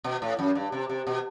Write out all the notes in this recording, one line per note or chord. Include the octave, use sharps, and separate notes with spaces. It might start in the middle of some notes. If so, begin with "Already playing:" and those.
B2
A2
F#2
G2
C3
C3
B2